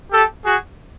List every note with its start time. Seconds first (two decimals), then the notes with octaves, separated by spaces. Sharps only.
0.11 G4 A4
0.44 F#4 G#4